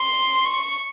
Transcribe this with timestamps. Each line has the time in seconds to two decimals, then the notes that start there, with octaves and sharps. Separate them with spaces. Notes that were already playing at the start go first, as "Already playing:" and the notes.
Already playing: C6
0.45 C#6